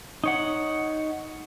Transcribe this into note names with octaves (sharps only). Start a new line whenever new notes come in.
D#4 C#5 F#5